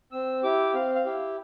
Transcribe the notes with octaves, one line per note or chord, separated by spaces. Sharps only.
C4 E6
E4 G4 D6
C4 F5
F5
E4 G4